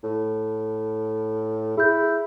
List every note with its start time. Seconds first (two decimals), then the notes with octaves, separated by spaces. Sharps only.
0.04 A2
1.77 E4 G#4 G6